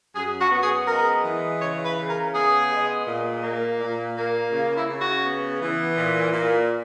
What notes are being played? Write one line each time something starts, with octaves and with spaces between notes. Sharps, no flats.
F#2 G#4
F#4
B3
G#4
G#3 A#4
E3
C#3 C#5
B4
C#3
A#4
B3 G#4
G#3
A#2
A#3
A#2
A#3
C#3
E4
C#3
F#4
B3
E3
A#2
A#2